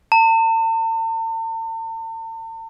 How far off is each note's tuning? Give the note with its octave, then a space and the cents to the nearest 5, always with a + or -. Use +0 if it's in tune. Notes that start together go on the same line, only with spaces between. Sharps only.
A5 +45